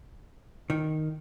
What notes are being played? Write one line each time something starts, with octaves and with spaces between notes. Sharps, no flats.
D#3